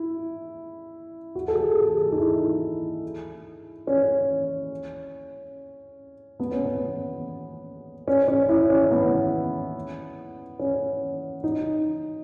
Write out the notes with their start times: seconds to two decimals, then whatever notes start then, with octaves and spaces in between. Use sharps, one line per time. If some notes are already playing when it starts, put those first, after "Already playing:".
Already playing: E4
1.35 F#4
1.48 A4
1.55 G#4
1.77 G#4
1.97 G#4
2.12 D#4
2.20 E4
3.87 C#4
6.40 B3
6.51 C#4
6.65 B3
8.08 C#4
8.28 C#4
8.49 E4
8.70 C#4
8.91 B3
10.59 C#4
11.44 D#4